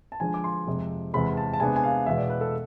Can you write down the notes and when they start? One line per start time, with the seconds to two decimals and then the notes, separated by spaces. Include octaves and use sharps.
0.12 A5
0.20 D3 F3 G#3 D4 G#5
0.34 D6
0.44 C6
0.67 F2 C3 G#3
1.13 E2 C3 G#3 B5
1.37 A5
1.53 A5
1.60 C3 G#3 B3 D4 G#5
1.76 G#5
1.84 F5
2.06 E2 B2 G#3 E5
2.18 D5
2.30 B4
2.41 A4